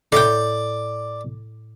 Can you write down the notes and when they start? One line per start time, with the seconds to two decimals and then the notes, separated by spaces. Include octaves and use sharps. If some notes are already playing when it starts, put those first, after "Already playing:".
0.12 A2 D5 G5 D6